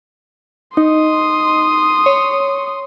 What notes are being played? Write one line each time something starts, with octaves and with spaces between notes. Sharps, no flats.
D#4 C6 D#6
C#5